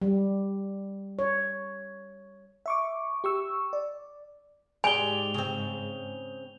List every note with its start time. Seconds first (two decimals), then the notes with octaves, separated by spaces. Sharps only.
0.02 G3
1.19 C#5
2.66 E5 C#6 D6
3.24 G4 C#6 E6
3.73 D5
4.84 G#2 G#3 G4 D5 G#5 F7 G7
5.34 C#3 C4